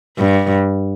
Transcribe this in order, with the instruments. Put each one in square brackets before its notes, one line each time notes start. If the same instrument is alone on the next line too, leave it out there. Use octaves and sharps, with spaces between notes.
[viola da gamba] G2